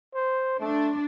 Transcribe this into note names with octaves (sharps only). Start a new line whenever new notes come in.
C5
A3 D4